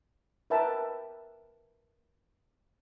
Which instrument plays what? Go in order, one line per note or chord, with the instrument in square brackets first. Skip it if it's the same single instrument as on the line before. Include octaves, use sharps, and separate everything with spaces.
[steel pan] A#4 B4 E5 G5 A5 A#5